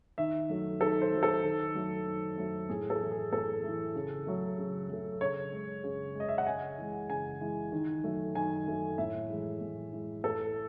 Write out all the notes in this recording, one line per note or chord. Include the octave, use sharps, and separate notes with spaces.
D#3 E5
F#3 A3
D#3 A4
C5
F#3 A3
A4
D#3
F#3 A3
D#3
F#3 A3
A2 G#4
A4
E3 A3
G#4
A2 A4
E3 A3
C#3
F#3 A3
C#3
F#3 A3
C#3 C#5
G#3
C#3
G#3
D#5
E5
F#5
C#3 G#5
E3 G#3
C#3 G#5
E3 G#3
D#3
F#3 A3
D#3 G#5
F#3 A3
A2 E5
E3 G#3
A2
E3 G#3
A2 A4